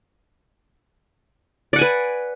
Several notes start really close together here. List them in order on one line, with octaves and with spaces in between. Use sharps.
D5 F#5 G#5 B4